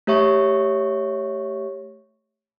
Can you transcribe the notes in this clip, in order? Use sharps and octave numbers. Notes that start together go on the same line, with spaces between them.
A3 G4 C#5 E5 C#6